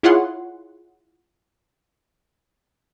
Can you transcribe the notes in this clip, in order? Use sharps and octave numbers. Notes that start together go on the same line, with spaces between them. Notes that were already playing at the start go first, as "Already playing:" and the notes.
E4 F4 G#4 C#5 F#5 C6